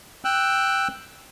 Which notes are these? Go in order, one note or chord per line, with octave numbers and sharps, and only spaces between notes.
G5 E6 F#6